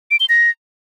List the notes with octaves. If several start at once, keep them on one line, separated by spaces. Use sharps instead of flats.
D7
G7
A#6